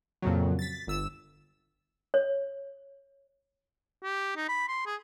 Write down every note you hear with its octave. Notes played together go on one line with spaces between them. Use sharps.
F2 A#2 C#3 F#3
A6 B6
G1 E6 E7
C#5
G4
D#4
B5
C6
G#4